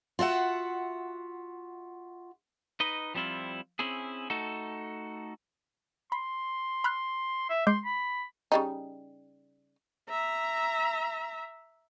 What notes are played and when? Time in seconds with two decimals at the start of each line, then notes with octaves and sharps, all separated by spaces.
0.19 F4 F#4 E5 F#5
2.80 D#4 B4 D#5
3.14 F3 G3 C4 E4 F4
3.79 C4 C#4 E4 G#4
4.30 A3 D#4 F#4 A4
6.12 B5 C6
6.84 B5 F6 F#6
7.49 E5
7.67 G#3 C6 D6 G6
7.85 B5
8.52 C#3 G3 D#4
10.09 E5 A#5